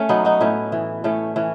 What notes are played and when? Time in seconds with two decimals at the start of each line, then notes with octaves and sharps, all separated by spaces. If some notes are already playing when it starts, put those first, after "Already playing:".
Already playing: A3 C#4
0.09 F#3 B3 D#4
0.25 D#4 F#4
0.40 A2 C#4 E4
0.72 E3
1.04 A2 A3 C#4
1.36 E3 C#4